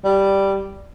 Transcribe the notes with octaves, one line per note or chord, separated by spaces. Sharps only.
G3